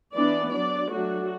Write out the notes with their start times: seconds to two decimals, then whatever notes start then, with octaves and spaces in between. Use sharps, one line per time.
0.14 E3 B3 D4 D5
0.52 F#3 D4 D5
0.90 F#3 A3 D4 F#4